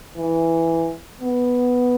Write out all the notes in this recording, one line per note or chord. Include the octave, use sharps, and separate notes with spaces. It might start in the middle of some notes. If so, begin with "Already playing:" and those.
E3
B3